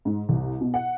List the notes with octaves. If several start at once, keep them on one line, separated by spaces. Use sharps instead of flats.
G#2
C2
B2
F#5